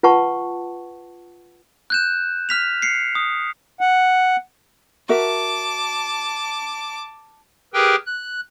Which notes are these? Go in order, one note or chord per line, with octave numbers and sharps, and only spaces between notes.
F4 B4 F#5 A5 C#6
F#6 G6 E7
F6 B6 F7
C7 C#7
D#6
F#5
F#4 A#4 E5 A5 D6
G4 G#4 A#4 B4 G5
F#6